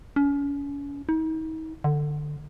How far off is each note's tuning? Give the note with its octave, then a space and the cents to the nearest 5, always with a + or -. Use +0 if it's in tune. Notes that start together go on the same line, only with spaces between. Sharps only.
C#4 +35
D#4 +40
D3 +15